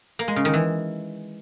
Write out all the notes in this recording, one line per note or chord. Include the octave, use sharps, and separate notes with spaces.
A#3
G#3
C#3
D#3
E3